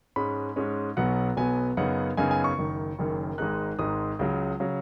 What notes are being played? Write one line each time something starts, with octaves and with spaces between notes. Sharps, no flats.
G#2 G#3 C#4 B5
G#2 G#3 C#4
B1 B2 F#3 B3 F#5
B1 B2 F#3 B3 G#5
F#2 C#3 B3 D#4 F#5
F#2 C#3 B3 D#4 G#5
G#5
C#6
F#1 F#2 D#3
F#1 F#2 D#3
G#1 G#2 G#3 D#4 F#6
G#1 G#2 G#3 D#4 D#6
C#2 C#3 F#3
C#3 F#3